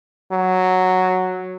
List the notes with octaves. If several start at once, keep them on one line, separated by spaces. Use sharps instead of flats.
F#3